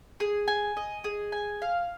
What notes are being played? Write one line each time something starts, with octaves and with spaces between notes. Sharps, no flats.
G#4
G#5
D#5
G#4
G#5
F5